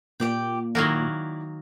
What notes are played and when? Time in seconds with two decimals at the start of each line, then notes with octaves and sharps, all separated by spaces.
0.20 A#2 G4 D5 G5
0.75 D#3 F#3 A#3 E4 D5 F#5